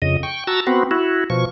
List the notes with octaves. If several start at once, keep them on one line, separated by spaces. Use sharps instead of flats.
F2 C#3 D#5
G5 C#6
F#4 A5 A#5 E6
B3 C4 F#4
E4 F#4
B2 F3 C#6